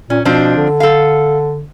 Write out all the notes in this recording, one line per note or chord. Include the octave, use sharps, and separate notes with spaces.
A#2 C#4
B2 F3 C4 D4
D3
A4 F5